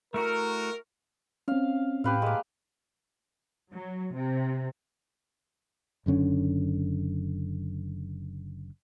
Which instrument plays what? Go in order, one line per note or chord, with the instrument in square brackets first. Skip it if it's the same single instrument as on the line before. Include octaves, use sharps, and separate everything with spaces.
[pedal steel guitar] A3 E4 F#4 [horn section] A#4
[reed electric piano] C4 C#4 [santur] F5
[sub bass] A2 [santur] G4 B4 F5
[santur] G#3 A#3
[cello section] F#3
C3
[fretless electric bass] F#1 F#2 D3 C#4